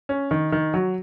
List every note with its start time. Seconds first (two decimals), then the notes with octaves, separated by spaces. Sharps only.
0.09 C#4
0.31 D#3
0.52 D#3
0.74 F#3